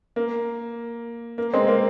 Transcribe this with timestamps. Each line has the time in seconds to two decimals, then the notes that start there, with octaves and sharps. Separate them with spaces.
0.16 A#3
1.38 A#3
1.54 G#3 C4
1.68 A#3